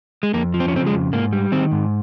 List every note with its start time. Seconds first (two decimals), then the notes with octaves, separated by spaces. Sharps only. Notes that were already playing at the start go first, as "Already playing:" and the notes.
0.23 G#3
0.34 F2 A#3
0.54 F3
0.60 C4
0.68 C#4
0.73 C#3 C4
0.86 G#3
0.93 F2
1.13 G#2 A#3
1.33 G3
1.52 D#3 C4
1.72 G#2